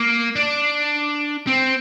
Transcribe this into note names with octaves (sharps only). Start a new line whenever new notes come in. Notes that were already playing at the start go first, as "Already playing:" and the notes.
Already playing: A#3
D4
C4